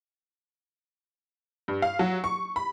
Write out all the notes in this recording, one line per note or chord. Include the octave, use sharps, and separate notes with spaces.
G2
F5
F#3
C#6
B5